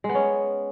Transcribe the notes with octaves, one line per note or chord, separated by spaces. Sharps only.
G#3
B3
C#4